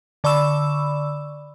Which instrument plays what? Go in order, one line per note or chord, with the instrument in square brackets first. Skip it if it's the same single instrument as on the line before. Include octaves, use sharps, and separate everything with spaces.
[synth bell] D3 D5 B5 C#6 E6 E7